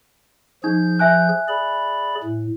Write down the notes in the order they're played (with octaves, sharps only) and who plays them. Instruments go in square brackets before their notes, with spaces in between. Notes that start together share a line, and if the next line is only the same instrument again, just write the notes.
[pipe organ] F3 G#4 G6 [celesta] D#4
[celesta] E5 G#5 F#6
[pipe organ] G#4 D5 B5
A2